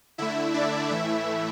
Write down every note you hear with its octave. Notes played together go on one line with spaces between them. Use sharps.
D3 A3 E4 E5
D4 D5
A2 E3 A3 E4 E5